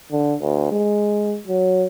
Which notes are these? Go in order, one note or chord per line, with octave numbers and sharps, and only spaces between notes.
D3
D2
G#3
F#3